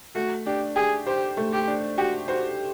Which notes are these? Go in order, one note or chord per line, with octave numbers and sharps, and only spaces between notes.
A3 F#4
D4 G4
G4 G#4
G4 C5
A3
G4
D4
F#4 G4
F#4 C5